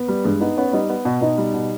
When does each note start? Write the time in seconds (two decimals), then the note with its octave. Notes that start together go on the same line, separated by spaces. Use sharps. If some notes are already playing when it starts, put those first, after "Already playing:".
Already playing: B3 B4
0.08 G3
0.24 G2 G#3 G#4
0.40 B3 D#4 D#5
0.57 B3 C#4 C#5
0.68 C#5
0.73 G3 D#4 D#5
0.89 B3
1.05 B2
1.21 B2 D#4 D#5
1.38 G3
1.54 B2